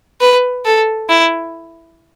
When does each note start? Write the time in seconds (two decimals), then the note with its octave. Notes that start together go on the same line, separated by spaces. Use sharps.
0.21 B4
0.66 A4
1.09 E4